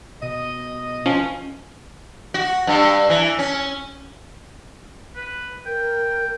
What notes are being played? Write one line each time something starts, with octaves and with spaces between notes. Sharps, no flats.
B2 D#5
F3 C#4
F#4
G2
E3
C#4
B4
A#4 G5